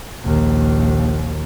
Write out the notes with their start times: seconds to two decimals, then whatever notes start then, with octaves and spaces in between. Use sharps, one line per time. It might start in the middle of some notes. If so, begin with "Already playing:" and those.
0.23 A#1 D#2